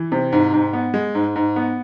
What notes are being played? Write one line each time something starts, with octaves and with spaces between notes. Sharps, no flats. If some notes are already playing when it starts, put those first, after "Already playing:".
Already playing: E3
C3
G#2
G#2
B3
G#3
G#2
G#2
B3